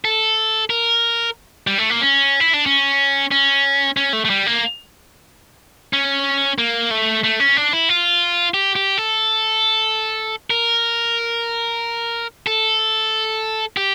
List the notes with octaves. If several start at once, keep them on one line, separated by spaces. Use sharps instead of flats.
A4
A#4
G3
A3
A#3
C#4
E4
D4
C#4
C#4
C#4
A3
A3
G3
A#3
C#4
A#3
A3
A3
C#4
D4
E4
F4
G4
G4
A4
A#4
A4
G4